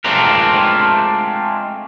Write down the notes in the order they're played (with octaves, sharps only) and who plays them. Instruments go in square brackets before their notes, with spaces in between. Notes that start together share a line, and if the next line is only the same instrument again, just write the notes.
[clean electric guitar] G#3 A3 C4 D4 F4 A#4